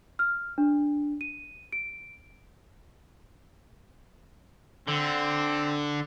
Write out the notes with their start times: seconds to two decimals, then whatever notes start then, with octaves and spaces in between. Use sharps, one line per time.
0.19 F6
0.58 D4
1.21 D#7
1.72 D7
4.88 D3 C4